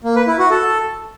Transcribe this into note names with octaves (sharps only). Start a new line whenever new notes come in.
A#3
B4
E4
F#4
A4